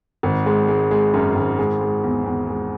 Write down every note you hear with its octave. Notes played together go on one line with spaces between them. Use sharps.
G#1
G#3
G#3
G#3
F#2
G#1
G#3
G#3
E2
E2
G#3